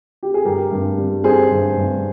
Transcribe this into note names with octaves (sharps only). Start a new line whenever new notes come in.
G4
G#4
G2 G4 A#4
G2
G3
G3 G#4 C5
G2
G2